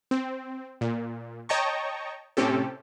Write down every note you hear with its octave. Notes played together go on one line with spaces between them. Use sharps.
C4
A#2
C#5 D#5 G5 A5 A#5 C#6
A2 C3 C4 C#4 G4 A4